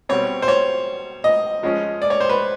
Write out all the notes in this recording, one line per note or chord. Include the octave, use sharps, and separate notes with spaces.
B2 G3 C4 C#5
C5
C#5
D#5
F3 G#3 C#4
D5
C#5
C5
B4